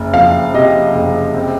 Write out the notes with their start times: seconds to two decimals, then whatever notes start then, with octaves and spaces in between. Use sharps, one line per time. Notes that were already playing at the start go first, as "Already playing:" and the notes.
Already playing: F#1
0.13 F2 F5
0.54 C3 D#5
0.95 F#1
1.34 C4